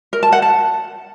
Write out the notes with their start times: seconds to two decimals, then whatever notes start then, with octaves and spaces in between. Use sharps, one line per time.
0.13 A#4
0.23 A5
0.32 F#5
0.42 A5